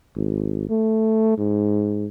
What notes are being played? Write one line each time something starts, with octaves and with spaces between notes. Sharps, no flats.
G#1
A3
G#2